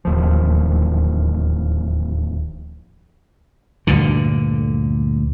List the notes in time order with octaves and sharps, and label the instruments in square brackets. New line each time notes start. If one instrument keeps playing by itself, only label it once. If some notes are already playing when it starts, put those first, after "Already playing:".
[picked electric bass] D1 D#2 F3
[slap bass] D2 G2 A#2 D3